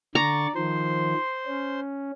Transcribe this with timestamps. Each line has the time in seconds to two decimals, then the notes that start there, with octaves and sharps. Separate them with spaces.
0.15 D3 D5 A#5 C#6 A6
0.55 D#3 F3 C5 C6
1.47 C#4